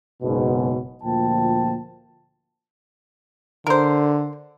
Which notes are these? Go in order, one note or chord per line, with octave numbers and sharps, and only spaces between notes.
F#1 G#2 B2
D2 A#2 F3 G5 A5
D3 A#4 C5